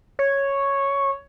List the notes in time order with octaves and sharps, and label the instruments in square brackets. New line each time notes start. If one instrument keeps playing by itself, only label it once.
[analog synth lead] C#5